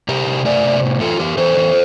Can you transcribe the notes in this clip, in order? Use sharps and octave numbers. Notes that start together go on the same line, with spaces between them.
C3 G4 A#4
C3
A3 A#4 D5
C3
A2
E3 F4 A4
E3 G4 A#4
E3 A4 C5
E3